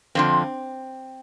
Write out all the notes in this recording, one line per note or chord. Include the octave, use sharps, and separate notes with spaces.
F2 D3 F3 C4